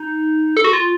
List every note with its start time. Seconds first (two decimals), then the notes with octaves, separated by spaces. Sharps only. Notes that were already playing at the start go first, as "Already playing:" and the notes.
Already playing: D#4
0.57 A4
0.64 F#4
0.73 F4